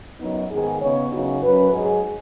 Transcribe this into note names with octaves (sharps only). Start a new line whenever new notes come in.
F#2 F#3 B3 D#4
G#2 D#3 B3 G#4
C#3 B3 D#4 C#5
F#2 C#3 B3 D#4 F#4
F#2 F#3 C#4 B4
G#2 F#3 D#4 G#4